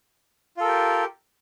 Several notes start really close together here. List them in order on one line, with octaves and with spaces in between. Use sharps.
F4 A4 A#4 G4